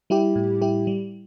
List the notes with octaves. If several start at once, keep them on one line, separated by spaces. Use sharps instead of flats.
G3 E4 G4
A2
G3 E4 G4
G3